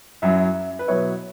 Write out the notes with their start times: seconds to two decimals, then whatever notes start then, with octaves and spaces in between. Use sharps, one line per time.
0.22 F#2 F#3 E4 E5
0.79 B4
0.88 B2 F#3 B3 E4 C#5